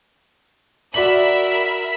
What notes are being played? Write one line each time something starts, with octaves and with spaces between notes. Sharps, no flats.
F#4 A#4 D5 E5 B5 F#7